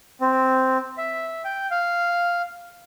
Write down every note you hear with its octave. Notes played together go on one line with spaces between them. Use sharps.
C4
E5
G5
F5